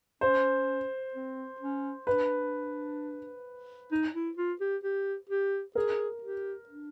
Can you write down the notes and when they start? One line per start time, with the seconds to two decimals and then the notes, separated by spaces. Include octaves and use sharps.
0.21 C#4 C5
1.14 C4
1.61 C#4
2.07 D4 B4
3.91 D#4
4.14 E4
4.37 F4
4.61 G4
4.83 G4
5.29 G4
5.75 G#4 A#4
6.22 G4
6.69 D4